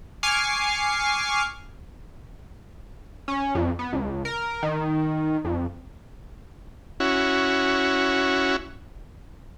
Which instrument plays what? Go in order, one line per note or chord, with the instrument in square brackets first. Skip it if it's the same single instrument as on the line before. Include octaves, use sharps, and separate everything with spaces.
[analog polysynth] G#5 C#6 D6 F6 C7
C#4
F2
B3
C#2
A#4
D#3
F2
[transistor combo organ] C#4 E4 F#4